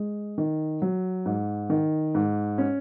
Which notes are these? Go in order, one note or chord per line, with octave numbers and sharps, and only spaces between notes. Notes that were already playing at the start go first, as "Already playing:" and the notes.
Already playing: G#3
D#3
F#3
G#2
D#3
G#2
C#4